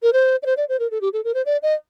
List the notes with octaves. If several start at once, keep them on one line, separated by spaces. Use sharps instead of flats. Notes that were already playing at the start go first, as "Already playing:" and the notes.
A#4
C5
D5
C5
D5
C5
A#4
A4
G4
A4
A#4
C5
D5
D#5